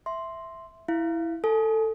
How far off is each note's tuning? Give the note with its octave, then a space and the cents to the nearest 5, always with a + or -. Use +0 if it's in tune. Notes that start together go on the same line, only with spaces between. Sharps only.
E5 +0 C6 +0
E4 +0 F5 -20
A4 +15 G#5 +35